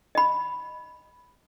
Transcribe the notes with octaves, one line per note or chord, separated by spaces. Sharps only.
D#5 B5